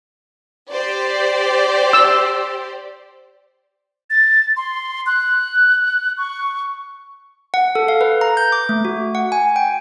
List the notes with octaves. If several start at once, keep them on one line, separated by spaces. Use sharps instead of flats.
G4 C5 D5
E6
A6
C6
F#6
C#6
F#5
A4
F5
B4
A#5
G6
D6
A3
F#4
F#5
G#5
G5